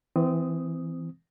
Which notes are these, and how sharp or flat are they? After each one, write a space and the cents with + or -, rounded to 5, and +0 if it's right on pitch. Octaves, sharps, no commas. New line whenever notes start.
E3 +0 C4 -25 D#6 +0